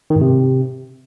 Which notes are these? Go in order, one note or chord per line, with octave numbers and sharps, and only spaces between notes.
D#3
G#2
C3